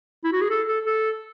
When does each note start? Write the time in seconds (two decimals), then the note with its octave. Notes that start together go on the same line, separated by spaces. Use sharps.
0.24 E4
0.32 F#4
0.41 G#4
0.50 A4
0.67 A4
0.86 A4